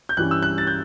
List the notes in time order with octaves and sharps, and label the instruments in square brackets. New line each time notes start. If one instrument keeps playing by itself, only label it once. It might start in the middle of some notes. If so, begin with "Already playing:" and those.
[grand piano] G6
G2 E3 G3 C#4 F#6
E6
F#6
A6
G6